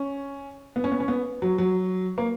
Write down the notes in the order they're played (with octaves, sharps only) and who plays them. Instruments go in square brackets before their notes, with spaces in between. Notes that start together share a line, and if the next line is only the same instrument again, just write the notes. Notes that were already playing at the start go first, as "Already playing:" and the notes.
Already playing: [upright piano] C#4
B3
C#4
B3
C#4
B3
F#3
F#3
A#3